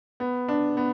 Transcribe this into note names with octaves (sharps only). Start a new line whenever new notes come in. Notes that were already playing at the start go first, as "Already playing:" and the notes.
B3
D4
B3